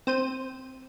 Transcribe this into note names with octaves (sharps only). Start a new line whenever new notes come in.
C4 C5 D#7